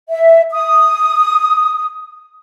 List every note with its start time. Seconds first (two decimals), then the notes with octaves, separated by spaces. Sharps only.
0.10 E5
0.51 D#6